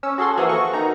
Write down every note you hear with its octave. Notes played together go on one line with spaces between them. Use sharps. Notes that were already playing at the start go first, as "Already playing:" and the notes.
C#4 E6
F#4 G#4 A4 C6
E3 F3 A#3 F#4 G#4 A4
F#4 C#6
D#3 D#4 A#5